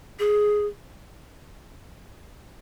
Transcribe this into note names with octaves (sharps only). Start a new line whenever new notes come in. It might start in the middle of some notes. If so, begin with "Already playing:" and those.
G#4